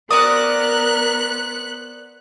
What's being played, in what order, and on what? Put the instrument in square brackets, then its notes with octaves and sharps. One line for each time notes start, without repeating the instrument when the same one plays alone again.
[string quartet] B3 F#6 [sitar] C4 F#4 D5 [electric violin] A#4 [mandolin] D#6